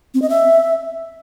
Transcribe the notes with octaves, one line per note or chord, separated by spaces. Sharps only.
C4
D#5
E5